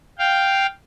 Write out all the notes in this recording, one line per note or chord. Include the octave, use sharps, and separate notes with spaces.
F5 G5